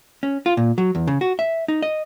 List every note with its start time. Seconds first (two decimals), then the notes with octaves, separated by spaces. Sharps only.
0.23 C#4
0.46 F4
0.57 A#2
0.78 F#3
0.95 E2
1.08 C#3
1.21 F#4
1.39 E5
1.68 D#4
1.82 D#5